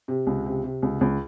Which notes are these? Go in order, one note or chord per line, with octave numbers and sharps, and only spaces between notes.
C3
C#2
C3
C3
C#2
C#2